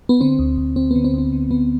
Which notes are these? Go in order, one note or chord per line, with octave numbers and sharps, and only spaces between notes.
B3
D3 C4
D2
D2
D2 C4
D3 B3
C4
D2 B3
D3
D3 B3